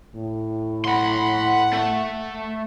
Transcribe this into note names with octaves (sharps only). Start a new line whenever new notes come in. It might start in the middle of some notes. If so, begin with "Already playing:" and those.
A2
F#5 B5 C6
A3